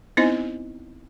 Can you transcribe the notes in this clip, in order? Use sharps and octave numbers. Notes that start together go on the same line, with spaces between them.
B3 C4 D#4 E4 C5 D#5